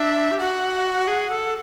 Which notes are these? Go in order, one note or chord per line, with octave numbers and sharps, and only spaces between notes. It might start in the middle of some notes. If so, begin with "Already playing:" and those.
Already playing: D4 E5
G4
F#4 F#5
G#4
A4